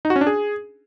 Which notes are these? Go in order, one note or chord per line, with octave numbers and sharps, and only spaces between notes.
D#4
F#4
C#4
D4
G#4